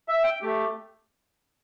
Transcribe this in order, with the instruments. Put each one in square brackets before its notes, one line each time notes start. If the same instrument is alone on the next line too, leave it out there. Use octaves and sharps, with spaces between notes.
[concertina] E5
G5
A3 G4